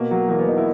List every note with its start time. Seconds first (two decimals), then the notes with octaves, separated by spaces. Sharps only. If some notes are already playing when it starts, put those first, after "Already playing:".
Already playing: B2 A#3
0.11 F#3
0.29 E2 A#3
0.39 B3
0.48 E2 D#4
0.57 E4